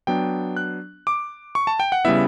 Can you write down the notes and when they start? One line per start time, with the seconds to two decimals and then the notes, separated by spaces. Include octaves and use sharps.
0.07 F#3 B3 D4 G5
0.57 F#6
1.07 D6
1.55 C#6
1.67 A5
1.80 G5
1.92 F#5
2.05 C#3 G3 B3 E4 E5